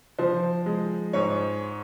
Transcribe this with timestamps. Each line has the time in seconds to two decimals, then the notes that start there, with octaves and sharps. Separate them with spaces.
0.19 F3 C5
0.66 G#3
1.13 G#2 C#5